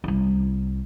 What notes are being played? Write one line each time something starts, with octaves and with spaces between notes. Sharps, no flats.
C2 E4